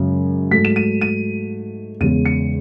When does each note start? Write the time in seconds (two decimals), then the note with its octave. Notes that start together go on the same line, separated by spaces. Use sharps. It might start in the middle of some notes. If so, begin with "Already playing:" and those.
Already playing: F#2 C#3 G#3
0.51 G#2 F#3 A3 B6
0.65 E7
0.76 D#7
1.01 D#7
2.00 E2 C#3 G#3 D#7
2.25 C#7